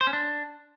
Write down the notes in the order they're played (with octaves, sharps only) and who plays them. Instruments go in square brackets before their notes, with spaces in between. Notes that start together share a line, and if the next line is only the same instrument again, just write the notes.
[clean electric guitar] C5
C#4
D4